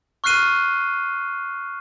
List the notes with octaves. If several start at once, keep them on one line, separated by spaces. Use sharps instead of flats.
C#6 F6 F#6 C7 D#7 G7